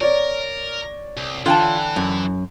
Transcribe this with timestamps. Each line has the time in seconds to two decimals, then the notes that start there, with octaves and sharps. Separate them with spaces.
0.01 A#4 C#5 D5
1.17 C2
1.46 D3 E3 F4 G5 A5
1.96 F#2